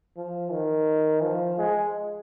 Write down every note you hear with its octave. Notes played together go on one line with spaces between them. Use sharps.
F3
D#3
F3
G#3